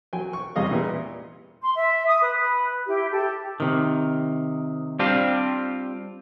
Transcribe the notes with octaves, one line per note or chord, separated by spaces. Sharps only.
F#3 G5 G#5
C#6
E2 C3 G3 G#4 D#5 F5
A#2 E3 B3 E4 G4
C6
E5
D#6
B4
E4 G4
G4 A4
C3 D#3
G3 C4 D4 F4 G4